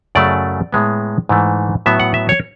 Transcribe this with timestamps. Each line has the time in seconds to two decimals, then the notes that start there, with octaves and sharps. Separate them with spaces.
0.15 F#2 C#3 F#3 A3 D5
0.72 A2 G#3 B3
1.29 G#2 E3 A3
1.86 A2 F#3 B3 E5
2.00 F#5
2.14 E5
2.29 C#5